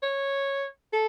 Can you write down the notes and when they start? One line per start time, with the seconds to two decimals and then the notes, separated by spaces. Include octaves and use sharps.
0.03 C#5
0.93 A4